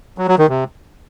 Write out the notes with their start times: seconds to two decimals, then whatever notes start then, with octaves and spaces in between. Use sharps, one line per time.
0.18 F#3
0.28 F#3
0.38 D#3
0.49 C3